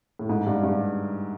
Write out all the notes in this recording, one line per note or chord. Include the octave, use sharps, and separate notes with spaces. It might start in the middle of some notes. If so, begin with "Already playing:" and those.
A2
G#2
G2
G2